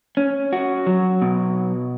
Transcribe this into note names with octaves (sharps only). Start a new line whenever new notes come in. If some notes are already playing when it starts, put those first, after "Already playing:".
C#4
F#4
F#3
B2